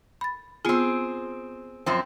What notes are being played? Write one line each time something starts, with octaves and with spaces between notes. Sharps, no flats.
B5 A6
B3 C4 F4 G#4
F#2 F3 C4